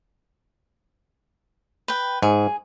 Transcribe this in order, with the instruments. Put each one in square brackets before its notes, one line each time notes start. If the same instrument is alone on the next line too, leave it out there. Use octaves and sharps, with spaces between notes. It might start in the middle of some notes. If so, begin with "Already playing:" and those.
[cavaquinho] B4 G5
[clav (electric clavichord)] G#2 [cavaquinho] G#4